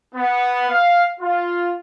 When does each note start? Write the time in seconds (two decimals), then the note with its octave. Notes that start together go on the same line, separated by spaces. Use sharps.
0.15 B3
0.69 F5
1.20 F4